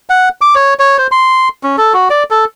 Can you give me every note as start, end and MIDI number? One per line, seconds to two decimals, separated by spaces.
0.10 0.29 78
0.41 0.55 86
0.55 0.74 73
0.79 0.97 73
0.98 1.07 72
1.12 1.49 84
1.63 1.76 61
1.78 1.93 69
1.94 2.09 66
2.10 2.23 74
2.30 2.45 69